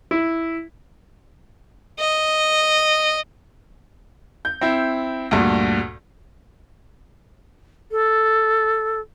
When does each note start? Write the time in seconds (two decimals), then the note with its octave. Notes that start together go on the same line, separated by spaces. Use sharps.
0.11 E4
2.00 D#5
4.45 G6
4.61 C4 E4
5.31 D2 G2 A#2
7.91 A4